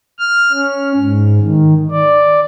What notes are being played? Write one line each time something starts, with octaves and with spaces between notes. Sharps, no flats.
F6
C#4
G#2
D#3
D5